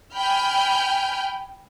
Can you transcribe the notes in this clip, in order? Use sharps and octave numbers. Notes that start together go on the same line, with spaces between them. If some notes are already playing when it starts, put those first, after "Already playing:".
G5 G#5 B5 F6 G6